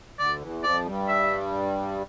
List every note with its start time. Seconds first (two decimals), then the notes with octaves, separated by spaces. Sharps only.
0.19 D2 D3 D5
0.41 E2 E3
0.63 F2 F3 D5
0.86 G2 G3
1.08 E5